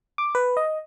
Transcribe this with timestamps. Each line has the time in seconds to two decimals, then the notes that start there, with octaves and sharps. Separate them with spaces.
0.18 D6
0.35 B4
0.57 D#5